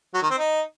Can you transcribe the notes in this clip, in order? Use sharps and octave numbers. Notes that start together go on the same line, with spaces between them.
F#3
D#3
C4
D#4